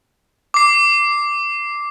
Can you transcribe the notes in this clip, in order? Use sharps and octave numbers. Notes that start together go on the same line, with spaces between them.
D6 C7